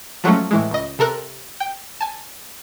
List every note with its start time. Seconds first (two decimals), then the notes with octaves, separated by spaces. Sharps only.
0.24 F3 F#3 G#3 A3 C#4
0.51 A2 E3 G#3
0.71 C#2 D#5
0.99 C3 A4 A#4 F#6
1.60 G5
2.01 G#5 A5